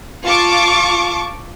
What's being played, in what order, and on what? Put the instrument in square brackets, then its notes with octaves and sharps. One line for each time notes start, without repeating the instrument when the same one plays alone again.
[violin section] F4 A5 C#6 D6